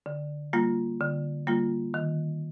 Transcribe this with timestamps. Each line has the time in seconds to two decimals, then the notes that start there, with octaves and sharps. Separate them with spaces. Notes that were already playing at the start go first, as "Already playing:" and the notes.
0.06 D3
0.53 G3 A#3 F4
1.01 D3
1.47 G3 A#3 F4
1.94 D#3